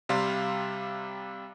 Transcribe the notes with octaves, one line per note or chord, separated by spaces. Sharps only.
C3 G3 F5 C6